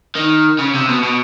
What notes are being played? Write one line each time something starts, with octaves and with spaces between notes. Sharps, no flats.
D#3
C#3
C3
B2
B2